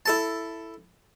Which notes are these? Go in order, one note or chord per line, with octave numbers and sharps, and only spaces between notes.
E4 A4 A5